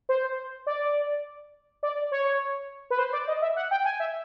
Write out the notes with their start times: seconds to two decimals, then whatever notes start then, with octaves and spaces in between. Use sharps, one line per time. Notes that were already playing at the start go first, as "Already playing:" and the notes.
0.09 C5
0.67 D5
1.83 D5
2.12 C#5
2.91 B4
2.98 C5
3.13 D5
3.28 D#5
3.42 E5
3.56 F#5
3.71 G5
3.85 G#5
4.00 E5